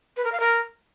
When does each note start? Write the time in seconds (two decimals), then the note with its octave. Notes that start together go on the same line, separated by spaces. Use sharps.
0.17 B4
0.24 A#4
0.32 F5
0.40 A#4